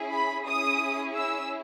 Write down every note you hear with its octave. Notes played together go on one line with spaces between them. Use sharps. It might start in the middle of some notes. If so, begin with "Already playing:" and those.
Already playing: C#4 E4 G#4
B5
C#4 E4 G#4 D#6
E6